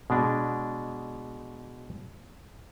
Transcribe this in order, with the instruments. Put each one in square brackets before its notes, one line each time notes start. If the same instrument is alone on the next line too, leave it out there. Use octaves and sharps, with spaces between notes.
[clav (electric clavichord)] B2 G#3 D4